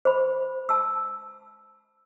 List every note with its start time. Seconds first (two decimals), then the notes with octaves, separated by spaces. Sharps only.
0.05 C5 B5
0.69 A5 E6